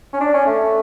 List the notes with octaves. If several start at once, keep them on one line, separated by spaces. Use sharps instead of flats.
C#4
D4
C#4
A3